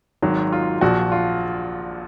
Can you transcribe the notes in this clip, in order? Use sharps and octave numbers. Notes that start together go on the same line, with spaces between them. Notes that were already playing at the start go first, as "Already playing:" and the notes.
G#1 G#2 D#3 F#3
F4
A#1 A#2 F3 F#4
F4